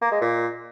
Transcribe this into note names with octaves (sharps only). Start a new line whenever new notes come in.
A#3
G#3
A#2